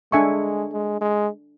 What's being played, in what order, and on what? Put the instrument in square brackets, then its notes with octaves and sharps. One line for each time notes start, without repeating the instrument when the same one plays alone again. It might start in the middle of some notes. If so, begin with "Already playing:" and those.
[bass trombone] G#3 [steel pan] D4 A4 E5 G#5 C#6
[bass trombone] G#3
G#3